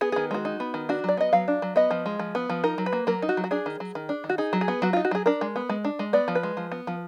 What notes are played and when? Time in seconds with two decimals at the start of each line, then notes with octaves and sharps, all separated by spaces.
0.01 B3 G#4
0.12 D#3 G#4
0.31 G#3 F#4
0.45 D#4
0.60 B3
0.74 D#3
0.89 D4 F#4
1.04 F#3 D5
1.17 B3 D#5
1.33 F#3 F5
1.48 D4
1.62 F#3
1.76 B3 D#5
1.91 F3
2.06 G#3
2.19 F3
2.35 B3
2.50 F3
2.64 D#4 A#4
2.78 F#3
2.86 B4
2.93 A#3
3.07 F#3 A#4
3.22 D#4
3.29 F#4
3.37 F#3
3.44 F#4
3.51 D4 G#4
3.66 D#3
3.80 F#3
3.95 D#3
4.09 D4
4.24 D#3
4.29 F#4
4.38 D#4 G#4
4.53 F#3
4.61 G#4
4.68 B3
4.82 F#3 F#4
4.93 D#4 F4
5.05 F#4
5.11 F#3 G#4
5.26 D4 A#4
5.41 G#3
5.56 B3
5.70 G#3
5.85 D4
5.99 G#3
6.13 B3 D5
6.28 F3
6.35 B4
6.43 G#3
6.57 F3
6.72 B3
6.87 F3